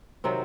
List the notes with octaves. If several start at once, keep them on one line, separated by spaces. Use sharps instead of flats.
C3 D#3 F#3 C4